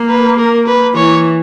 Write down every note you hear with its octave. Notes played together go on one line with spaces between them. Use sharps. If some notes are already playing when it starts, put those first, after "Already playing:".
Already playing: A#3
B4
A#4
B4
E3 C#5